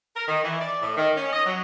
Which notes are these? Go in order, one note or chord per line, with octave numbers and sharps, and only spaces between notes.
A#4
D#3
E3
D5
A2
D#3
C#4
D#5
F#3